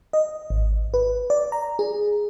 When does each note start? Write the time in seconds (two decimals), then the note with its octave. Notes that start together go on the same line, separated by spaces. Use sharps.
0.13 D#5
0.50 G#1
0.94 B4
1.30 D5
1.52 A#5
1.79 G#4